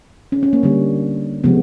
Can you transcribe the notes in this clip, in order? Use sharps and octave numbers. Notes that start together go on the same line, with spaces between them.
C#4
C#4
A#3
D3 G3 A#3
C3 F3 G#3 B3